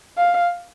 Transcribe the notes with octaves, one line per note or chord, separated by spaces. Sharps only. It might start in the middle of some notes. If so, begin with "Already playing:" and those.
F5